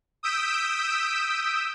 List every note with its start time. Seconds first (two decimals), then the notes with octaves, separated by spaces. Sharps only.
0.23 D#6 E6 G6 B6 D7 E7